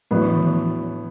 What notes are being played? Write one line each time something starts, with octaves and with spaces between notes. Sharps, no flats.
A2 F3 F#3 B3 D4
E3
D#3
E3